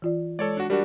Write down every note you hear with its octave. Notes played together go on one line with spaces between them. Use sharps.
E3 F4 D5
G#3 A4 C#5 D5
D4 F#4
G3 D4 F#4 G4 A#4 D5